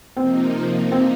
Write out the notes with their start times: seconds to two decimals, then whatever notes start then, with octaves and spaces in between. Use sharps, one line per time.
0.16 C3 F3 A#3 C4 D#4
0.92 C4